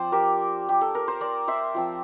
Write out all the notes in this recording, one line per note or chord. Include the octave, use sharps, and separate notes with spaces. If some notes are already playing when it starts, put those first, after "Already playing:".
Already playing: F3 C4 F4 C5 D5
G4 A#4
G4
A4
A#4
C5
A#4 D5
C5 E5
F3 C4 F4